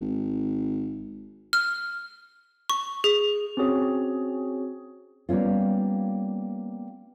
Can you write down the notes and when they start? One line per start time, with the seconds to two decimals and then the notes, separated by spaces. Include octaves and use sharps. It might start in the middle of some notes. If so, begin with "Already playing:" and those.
0.01 G#1
1.53 F6
2.70 C#6
3.04 G#4
3.57 C4 C#4 F#4 G#4 C#5
5.29 G3 A#3 B3 C#4 F4